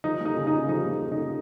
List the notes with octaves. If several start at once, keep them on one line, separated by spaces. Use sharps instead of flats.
F3 D#4
A#3
D#4
C#3
D#4
C#3
F3 D#4
A#3
C#3
D#4
C#3